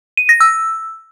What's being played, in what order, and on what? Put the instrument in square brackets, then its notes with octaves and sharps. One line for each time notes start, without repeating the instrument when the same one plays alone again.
[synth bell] D#7
A#6
E6